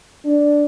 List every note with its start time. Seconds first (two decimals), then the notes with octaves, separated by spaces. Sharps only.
0.25 D4